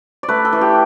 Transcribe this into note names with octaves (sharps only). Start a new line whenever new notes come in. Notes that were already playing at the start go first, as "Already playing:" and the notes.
D5
A3 B4
A4
E3
G4